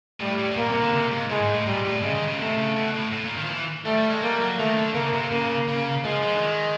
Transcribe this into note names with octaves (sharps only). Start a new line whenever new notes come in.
A2 G3
A2
A2
A#2 A#3
C3
D3
C3
G#2
A2 G#3
G#2
A2
A#2 G3
A2
C#3 G#3
D#3
C#3
C3 A3
C#3
B2
A2
A2
A#2
D#3
F3
E3
G3 A3
G3
G#3
G3 A#3
F#3
D#3 A3
D3
C#3 A#3
C3
C#3 A#3
C#3
F3 G#3
F3
D3
D#3